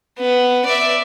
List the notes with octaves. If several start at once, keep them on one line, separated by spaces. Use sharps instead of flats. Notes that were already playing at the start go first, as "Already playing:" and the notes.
B3
D5 E5